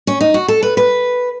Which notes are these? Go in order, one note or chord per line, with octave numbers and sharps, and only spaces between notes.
C#4
D#4
F#4
A4
B4
B4